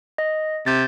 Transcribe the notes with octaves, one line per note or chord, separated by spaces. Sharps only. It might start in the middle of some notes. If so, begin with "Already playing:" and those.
D#5
C3 G6 A6